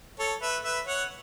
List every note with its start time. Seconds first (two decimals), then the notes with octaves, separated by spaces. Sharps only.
0.19 A4 C#5
0.42 B4 E5
0.64 B4 E5
0.87 C#5 F#5